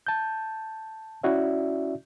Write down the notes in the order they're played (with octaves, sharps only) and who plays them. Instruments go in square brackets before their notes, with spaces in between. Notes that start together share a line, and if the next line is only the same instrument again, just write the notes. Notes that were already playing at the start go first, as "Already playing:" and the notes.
[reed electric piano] A5 G6
C#4 E4 F#4 D5 E5